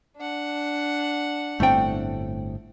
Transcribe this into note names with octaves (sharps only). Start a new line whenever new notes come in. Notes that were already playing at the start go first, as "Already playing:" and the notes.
D4 F#5
G1 A2 A3 C4 G5